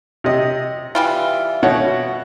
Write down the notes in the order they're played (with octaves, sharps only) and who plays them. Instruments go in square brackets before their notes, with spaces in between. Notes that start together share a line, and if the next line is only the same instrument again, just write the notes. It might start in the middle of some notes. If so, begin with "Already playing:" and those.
[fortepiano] C3 D#5
[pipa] E3 G3 F4
[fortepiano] B2 C#5 F#5